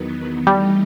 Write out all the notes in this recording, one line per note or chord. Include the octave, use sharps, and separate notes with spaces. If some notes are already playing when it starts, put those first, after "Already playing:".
Already playing: E2 D#3 F#3 B3
E3 G3 A3 D#4 G4